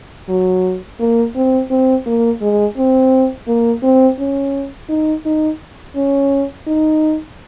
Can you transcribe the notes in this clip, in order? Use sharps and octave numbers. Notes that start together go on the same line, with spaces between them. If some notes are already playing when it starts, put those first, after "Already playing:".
F#3
A#3
C4
C4
A#3
G#3
C4
A#3
C4
C#4
D#4
D#4
C#4
D#4